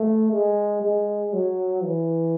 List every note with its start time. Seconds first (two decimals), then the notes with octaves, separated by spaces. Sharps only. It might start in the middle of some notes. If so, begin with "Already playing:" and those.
Already playing: A3
0.32 G#3
0.82 G#3
1.33 F#3
1.83 E3